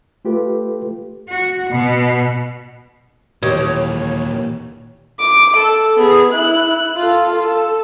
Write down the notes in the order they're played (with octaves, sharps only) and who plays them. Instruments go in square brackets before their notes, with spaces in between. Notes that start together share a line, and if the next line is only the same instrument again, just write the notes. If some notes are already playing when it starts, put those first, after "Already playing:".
[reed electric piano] A3 F4 G4 A4 B4
[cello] F#4
B2
[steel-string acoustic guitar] D#2 [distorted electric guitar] A#2 E3 [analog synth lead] C#5
[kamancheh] D6
A4
B3 G#4
E4 F#6
F4 A4
A4